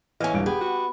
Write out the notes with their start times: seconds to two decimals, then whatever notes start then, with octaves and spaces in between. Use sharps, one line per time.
0.20 E3 C#4 D#5 F5 G#5
0.33 D#1 G2 D7
0.46 B3 G4 G#4
0.61 F#4